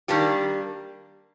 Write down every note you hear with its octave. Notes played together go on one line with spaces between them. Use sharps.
D#3 G3 A#3 D4 G4